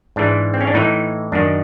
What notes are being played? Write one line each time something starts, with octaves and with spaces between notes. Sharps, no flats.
G#2 E3 D4
C4
C#4
D4
A2 E3 D#4
F#2 D#3 D4